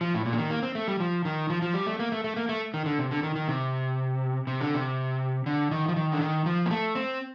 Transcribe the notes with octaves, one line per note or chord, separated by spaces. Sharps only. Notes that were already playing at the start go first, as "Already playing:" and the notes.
F3
A2
A#2
D3
D#3
A#3
C4
A3
G3
F3
D#3
F3
F3
G3
A3
A#3
A3
A3
A#3
A3
D#3
D3
C3
D3
D#3
D#3
C3
C3
D3
C3
D3
D#3
F3
D#3
D3
D#3
F3
A#3
A3
C4